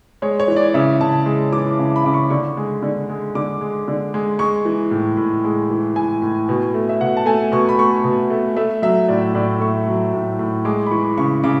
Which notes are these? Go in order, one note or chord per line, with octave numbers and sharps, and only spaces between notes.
G#3 C#5
C#5
E3
D5
C#3 E5
C#3 A5
G#3
E3 D6
C#3
B5
C#3 D6
C#6
D3 C#6
G#3
D3
G#3
D3 D6
G#3
D3
G#3
G#3 C#6
E3
A2
A2
G#3
E3
A2 G#5
A2
B2
A3
E5
B2 F#5
A5
A3 G#5
B2 C#6
B5
A3 C#6
B2
A3
A3 E5
F#3 E5
A2 D5
A2 D5
A3 C#6
F#3
A2
A2
G#3 D6
B5
E3 C#6
C#3 C#6
C#3 D6